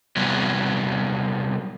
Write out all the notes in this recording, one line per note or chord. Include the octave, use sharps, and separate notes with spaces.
C3 F#3 G3 B3